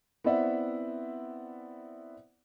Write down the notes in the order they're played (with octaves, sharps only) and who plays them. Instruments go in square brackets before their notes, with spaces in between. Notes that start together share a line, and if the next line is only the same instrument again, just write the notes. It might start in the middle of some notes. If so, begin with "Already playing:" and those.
[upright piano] B3 C4 E4 D5 E5 F#5